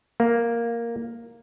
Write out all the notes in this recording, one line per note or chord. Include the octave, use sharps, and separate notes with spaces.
A#3